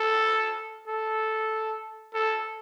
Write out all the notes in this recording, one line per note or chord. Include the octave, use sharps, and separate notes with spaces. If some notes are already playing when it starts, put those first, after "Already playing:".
Already playing: A4
A4
A4